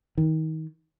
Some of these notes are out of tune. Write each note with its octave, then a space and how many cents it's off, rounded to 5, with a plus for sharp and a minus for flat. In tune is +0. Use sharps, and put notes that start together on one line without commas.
D#3 +30